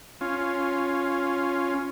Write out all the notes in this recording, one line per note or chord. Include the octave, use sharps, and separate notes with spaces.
C#4 F4